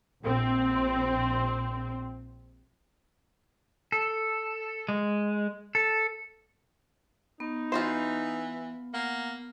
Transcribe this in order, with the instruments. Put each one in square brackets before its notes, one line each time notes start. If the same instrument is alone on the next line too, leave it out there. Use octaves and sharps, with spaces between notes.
[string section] A#1 C4
[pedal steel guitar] A4
G#3
A4
[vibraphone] B3 [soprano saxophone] D#4
[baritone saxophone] E3 [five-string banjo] F4 F#4 C5
[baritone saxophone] A#3 [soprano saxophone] F#5